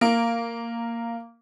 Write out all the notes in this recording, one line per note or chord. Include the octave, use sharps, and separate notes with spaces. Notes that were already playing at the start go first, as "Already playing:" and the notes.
A#3